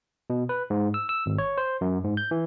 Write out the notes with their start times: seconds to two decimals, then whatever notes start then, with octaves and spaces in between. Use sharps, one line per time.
0.30 B2
0.49 B4
0.70 G#2
0.94 E6
1.09 E6
1.26 G#1
1.38 C#5
1.58 C5
1.81 F#2
2.04 G#2
2.17 G6
2.31 E3